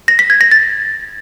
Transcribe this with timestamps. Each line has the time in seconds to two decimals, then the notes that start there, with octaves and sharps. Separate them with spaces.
0.08 A#6
0.19 B6
0.30 G#6
0.41 A#6
0.51 A6